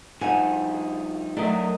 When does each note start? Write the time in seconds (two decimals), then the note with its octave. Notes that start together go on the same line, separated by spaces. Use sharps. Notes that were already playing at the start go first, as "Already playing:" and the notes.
0.21 G2 F3 D#4 F#5 G#5
1.37 F#3 A3 D4 A#4 D#5